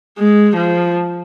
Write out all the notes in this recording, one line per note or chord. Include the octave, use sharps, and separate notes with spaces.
G#3
F3